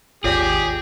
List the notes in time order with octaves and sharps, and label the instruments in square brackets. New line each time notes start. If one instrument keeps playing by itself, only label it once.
[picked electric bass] G#1 D#2 [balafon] F4 C#5 D5 [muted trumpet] G4 [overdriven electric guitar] G#4